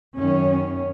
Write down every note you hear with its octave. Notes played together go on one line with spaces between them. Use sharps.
F#2 D#3 C#4